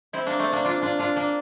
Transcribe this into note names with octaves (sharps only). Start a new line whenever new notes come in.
C4 E4
A#3 D4
A3 C4
A#3 D4
D4 F4
D4 F4
D4 F4
A#3 D4